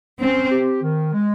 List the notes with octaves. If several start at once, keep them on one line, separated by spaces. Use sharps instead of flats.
C4 C#4
G4
D#3
G#3